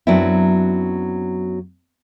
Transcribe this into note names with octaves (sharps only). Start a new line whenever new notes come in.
F#2 F#3 B3 C4 D4 E4